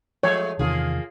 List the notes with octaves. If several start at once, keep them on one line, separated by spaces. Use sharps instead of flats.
F3 G#3 A3 C#5
E2 C3 D#3 A#3 F4 G#4